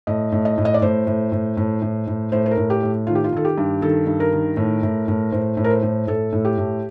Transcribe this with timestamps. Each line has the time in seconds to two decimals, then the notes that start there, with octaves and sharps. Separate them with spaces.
0.07 A2 D#5
0.32 A2
0.45 D#5
0.58 A2
0.65 D#5
0.74 D5
0.82 A2 C5
1.07 A2
1.32 A2
1.57 A2
1.82 A2
2.07 A2
2.32 A2 C5
2.46 C5
2.51 A#4
2.57 A2
2.70 G4
2.83 A2
3.07 D#3 F4
3.15 G4
3.24 F4
3.32 D#3 A4
3.45 G4
3.58 G2
3.82 D#3 A4
4.07 G2
4.20 A#4
4.33 D#3
4.57 A2
4.83 A2
5.08 A2
5.32 A2 C5
5.57 A2
5.64 A#4
5.70 C5
5.83 A2
6.07 A2 A4
6.33 A2
6.45 G4
6.58 A2